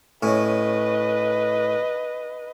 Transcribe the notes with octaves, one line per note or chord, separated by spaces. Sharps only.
A2 C#4 B4 D#5